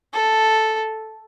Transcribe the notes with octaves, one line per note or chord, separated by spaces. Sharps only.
A4